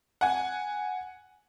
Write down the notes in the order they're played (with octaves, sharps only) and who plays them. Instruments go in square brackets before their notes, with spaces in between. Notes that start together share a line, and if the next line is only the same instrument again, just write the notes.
[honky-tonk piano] F#5 G#5